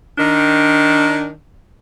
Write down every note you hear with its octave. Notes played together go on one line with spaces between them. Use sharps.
D#3 D4